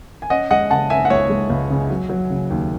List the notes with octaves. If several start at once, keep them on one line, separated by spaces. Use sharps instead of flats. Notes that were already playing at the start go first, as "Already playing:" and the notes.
G#5
C#4 D#5 F#5
G#3 D#5 F#5
C#3 F#5 A5
C#4 E5 G#5
F#5
C#2 C#5 E5
G#3
C#2
C#3
F#3
F#3
C#3
D#2